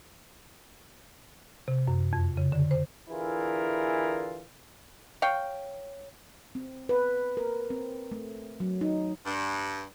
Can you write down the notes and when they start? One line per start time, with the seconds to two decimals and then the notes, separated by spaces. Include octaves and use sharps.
1.68 C3
1.87 F#2
2.13 F2
2.37 C#3
2.52 D3
2.71 C5
3.10 D3 E3 E4 F4 G#4 A#4
5.22 C#5 F5 G5
6.55 C4
6.89 B4
7.37 A#4
7.70 C4
8.11 A3
8.60 F#3
8.81 D#4
9.26 G2